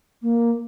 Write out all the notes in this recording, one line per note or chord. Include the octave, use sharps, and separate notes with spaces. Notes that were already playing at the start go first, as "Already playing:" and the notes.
A#3